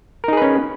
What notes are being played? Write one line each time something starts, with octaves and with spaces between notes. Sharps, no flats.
C#4 D#4 G#4 A#4 B4